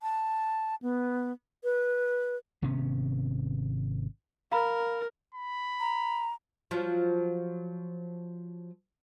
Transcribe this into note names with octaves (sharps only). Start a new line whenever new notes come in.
A5
B3
B4
G#1 C3 B3 C#4
A#4 F5 A#5 B5
B5
A#5
F3 F#3